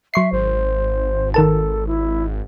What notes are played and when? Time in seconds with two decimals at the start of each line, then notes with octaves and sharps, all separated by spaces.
0.14 F#3 E5 C#6 C7
0.32 G#1 C5
1.34 D#3 A4 A#4 A5
1.87 E4